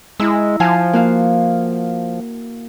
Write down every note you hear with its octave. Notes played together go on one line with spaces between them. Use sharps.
G#3 E4 A#5 E6
F3 F5 G#5 A5
A#3 F#4 F5